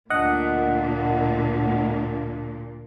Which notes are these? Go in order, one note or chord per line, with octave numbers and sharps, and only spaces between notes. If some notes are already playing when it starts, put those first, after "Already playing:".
D2 A#2 D4 D#5 F#5